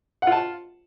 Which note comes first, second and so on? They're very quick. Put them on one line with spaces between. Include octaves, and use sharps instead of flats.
F#5 F4 A5